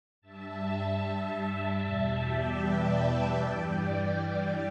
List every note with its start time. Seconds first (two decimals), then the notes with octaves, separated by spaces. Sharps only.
0.21 G2 G3 E5 A5
1.00 E5 A5
1.80 E2 B2 G3 E5 A5
2.19 D5 G5
2.58 B4 E5
3.38 G2 E3 G3 D5 G5
4.16 D5 G5